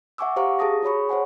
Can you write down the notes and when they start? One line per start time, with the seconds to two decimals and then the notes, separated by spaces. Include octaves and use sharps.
0.18 E5 F#5 G#5 C#6 D6 E6
0.36 G4 C5 F5 A#5 C#6
0.59 G#4 A5 D#6 A#6
0.83 F#4 G#4 C#5 B5 C#6
1.09 C5 C#5 F#5 G#5